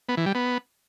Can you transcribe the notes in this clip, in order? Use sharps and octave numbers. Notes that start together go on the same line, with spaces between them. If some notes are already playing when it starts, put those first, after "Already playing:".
B3
E3
G3
B3